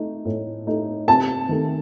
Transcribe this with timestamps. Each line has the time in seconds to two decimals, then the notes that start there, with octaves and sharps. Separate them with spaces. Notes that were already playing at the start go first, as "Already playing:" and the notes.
Already playing: A3 D#4
0.25 A2
0.67 A3 D#4
1.08 C3 A5
1.49 D#3 A3